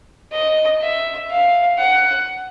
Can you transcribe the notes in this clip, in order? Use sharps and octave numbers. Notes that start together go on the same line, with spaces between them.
D#5
E5
F5
F#5